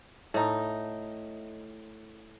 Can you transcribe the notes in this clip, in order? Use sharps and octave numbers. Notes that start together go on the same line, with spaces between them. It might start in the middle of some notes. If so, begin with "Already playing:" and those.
A2 A3 D#4